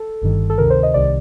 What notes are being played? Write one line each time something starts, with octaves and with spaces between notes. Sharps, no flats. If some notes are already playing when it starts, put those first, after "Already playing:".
Already playing: A4
G1 G2 D#3
A4
D2 C3 D#3 A#4
C5
D#5
C2 C3 D#3 D5